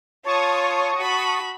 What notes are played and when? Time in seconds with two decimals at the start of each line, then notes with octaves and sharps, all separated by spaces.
0.25 F4 C#5 A5 C#6 D#6
0.97 F#4 B5